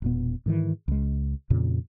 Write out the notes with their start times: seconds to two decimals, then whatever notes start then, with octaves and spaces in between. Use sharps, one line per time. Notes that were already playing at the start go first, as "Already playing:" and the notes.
0.02 E1 A#2 B3
0.46 G#2 D#3 E3
0.88 C#2 G#3
1.50 F2 A#2 C#3